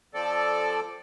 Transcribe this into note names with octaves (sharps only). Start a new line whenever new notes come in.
F3 C4 A4 D5